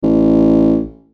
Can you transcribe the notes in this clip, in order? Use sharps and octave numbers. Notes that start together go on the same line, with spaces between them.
A1